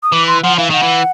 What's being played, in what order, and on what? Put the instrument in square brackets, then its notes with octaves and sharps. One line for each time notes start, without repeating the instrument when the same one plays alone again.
[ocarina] D#6
[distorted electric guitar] E3 [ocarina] D6
[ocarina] C6
[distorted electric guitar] F3 [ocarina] F#5
[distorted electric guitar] E3 [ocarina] F5
[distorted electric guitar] D#3 [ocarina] F#5
[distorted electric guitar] E3